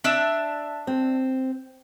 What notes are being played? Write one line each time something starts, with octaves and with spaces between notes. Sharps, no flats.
D4 E5
C4